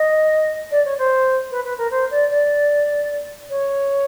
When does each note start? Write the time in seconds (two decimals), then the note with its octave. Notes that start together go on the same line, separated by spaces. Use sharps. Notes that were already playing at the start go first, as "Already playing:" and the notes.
Already playing: D#5
0.71 D5
0.84 C#5
0.98 C5
1.50 B4
1.64 B4
1.77 A#4
1.90 C5
2.10 D5
2.30 D5
3.49 C#5